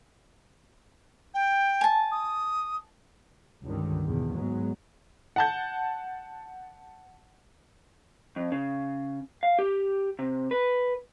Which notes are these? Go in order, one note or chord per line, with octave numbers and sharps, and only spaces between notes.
G5
G#5 A5
D#6
C#2 G2 D3 D#3
E2 B2
G#2 F#3 G#3 B3
F#5 A5 G6
F2
C#3
F5
G4
C3
B4